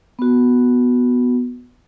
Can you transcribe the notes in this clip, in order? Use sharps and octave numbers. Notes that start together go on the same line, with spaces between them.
B3 F#4